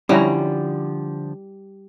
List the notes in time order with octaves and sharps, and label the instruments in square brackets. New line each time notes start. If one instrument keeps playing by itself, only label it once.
[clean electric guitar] D3 F3 [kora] G3 [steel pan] C#4 E4 A#5